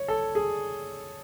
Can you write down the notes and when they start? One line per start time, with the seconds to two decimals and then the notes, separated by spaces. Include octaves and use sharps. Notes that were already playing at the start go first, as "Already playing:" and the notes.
Already playing: C#5
0.08 A4
0.35 G#4